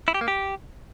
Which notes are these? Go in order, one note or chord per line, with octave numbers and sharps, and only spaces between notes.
E4
G4
A#3
G4